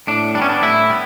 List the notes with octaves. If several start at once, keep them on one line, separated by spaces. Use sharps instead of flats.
A2 D4
G3 D4
B3 C#4
D4
A2 E4
G3 B3